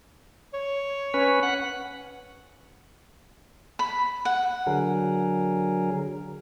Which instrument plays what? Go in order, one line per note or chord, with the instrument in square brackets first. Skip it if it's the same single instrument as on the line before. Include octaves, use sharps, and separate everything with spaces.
[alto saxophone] C#5
[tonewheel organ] C#4 B4
F#5
[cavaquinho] B5
F#5
[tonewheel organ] D3 F#3 G#4 A#4